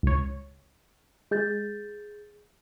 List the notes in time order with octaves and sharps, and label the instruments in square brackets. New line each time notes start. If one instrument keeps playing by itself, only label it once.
[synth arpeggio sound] C#2 C#5
[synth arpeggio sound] G#3 [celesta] G#4 G6 A6